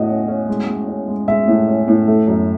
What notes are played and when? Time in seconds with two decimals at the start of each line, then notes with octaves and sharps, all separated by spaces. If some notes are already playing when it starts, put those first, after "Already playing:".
Already playing: A2 F#4 D#5 F#5
0.08 C#4
0.28 C#4
0.48 G#3
0.68 G#3
0.88 C#4
1.08 G#3
1.28 G#3 E5
1.47 A2
1.67 C#4
1.88 A2
2.07 A3
2.28 F#2